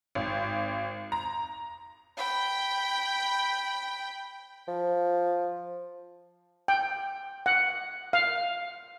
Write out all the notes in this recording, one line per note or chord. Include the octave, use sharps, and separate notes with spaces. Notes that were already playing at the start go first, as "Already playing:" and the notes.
G#1
A#5
G5 B5
F3
G5
F#5
F5